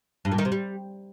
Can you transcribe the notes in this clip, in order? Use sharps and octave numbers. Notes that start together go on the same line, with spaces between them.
G2
A#2
D#3
C3
G3